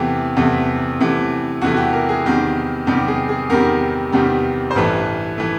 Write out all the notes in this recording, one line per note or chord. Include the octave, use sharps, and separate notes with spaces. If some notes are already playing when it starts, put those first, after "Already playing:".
Already playing: E2 C3 E3 A3 G4
E2 C3 E3 A3
E2 C3 E3 A3
E2 C3 E3 A3 F#4
G4
A#4
G#4
E2 C3 D#3 G3
E2 C3 D#3 G3 G4
G#4
G#4
E2 C3 D#3 G3 A#4
E2 C3 D#3 G3
C5
A1 G2 E3 A3 B4
E3 A3